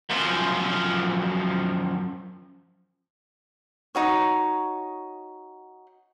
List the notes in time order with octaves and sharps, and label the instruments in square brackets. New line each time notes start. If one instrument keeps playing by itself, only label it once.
[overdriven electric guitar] F#2 F3
[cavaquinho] D#4 F#4 C#5